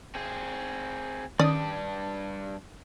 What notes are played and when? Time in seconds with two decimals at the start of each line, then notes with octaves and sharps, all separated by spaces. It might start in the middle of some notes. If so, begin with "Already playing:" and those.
0.15 C4 G#4
1.39 G2 D#3 C#4 D4 D5 D#6